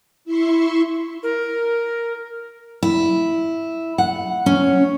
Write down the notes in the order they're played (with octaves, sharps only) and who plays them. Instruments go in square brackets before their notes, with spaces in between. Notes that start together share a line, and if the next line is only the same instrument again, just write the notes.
[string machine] E4 E5 C6 C#6
[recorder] A#4
[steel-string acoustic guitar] E4
F#5
C#4